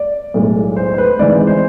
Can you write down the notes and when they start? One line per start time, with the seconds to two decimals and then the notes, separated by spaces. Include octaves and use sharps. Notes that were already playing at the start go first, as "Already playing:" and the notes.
Already playing: D5
0.34 B1 A2 G#3
0.76 C5
0.94 C5
0.98 B4
1.19 G#1 G#2 E3 G#3 D5
1.47 C5